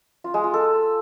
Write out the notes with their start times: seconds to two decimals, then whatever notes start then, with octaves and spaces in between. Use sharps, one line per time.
0.24 F4
0.34 G#3
0.44 F4
0.54 A4